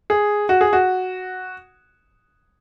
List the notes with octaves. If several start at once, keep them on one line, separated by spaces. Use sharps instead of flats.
G#4
F#4
G#4
F#4